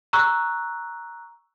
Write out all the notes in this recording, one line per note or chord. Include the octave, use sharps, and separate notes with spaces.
A#5 C#6 E6 F#6